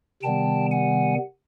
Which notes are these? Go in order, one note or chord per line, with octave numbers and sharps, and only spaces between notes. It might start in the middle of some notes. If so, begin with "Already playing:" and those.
C3 D#3 G3 B3 G5 A5
F#5 G#5